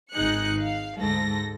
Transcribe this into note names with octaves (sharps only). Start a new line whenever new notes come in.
G#1 G#3 D#4 G#4 F#6 C#7
F5
D2 G#2 A4 A#6